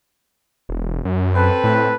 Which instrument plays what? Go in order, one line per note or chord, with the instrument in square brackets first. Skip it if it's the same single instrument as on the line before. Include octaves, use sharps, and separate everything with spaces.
[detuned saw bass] E1
F#2
[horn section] C4 A4 B4
[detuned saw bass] A2